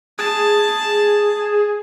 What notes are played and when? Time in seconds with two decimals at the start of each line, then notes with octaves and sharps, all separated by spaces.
0.19 G#4 A5